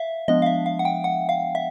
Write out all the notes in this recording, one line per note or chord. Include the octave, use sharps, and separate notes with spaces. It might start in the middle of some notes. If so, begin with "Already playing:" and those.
Already playing: E5 F5
F3 G#3 B3 D4 D#5
F5
E5
F5
F#5
G5
F#5
F5
E5